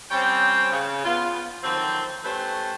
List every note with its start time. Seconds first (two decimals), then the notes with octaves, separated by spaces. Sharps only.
0.10 G3 C4 C#4 C#5 G5
0.72 C#3
1.04 B3 F4
1.64 D3 D#3 F3 F#3 C4
2.24 A3 C#4 G4 B4 C5